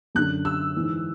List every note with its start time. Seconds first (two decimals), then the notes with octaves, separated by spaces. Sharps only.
0.15 F#2 D3 F#6
0.45 E6
0.76 G#2 E3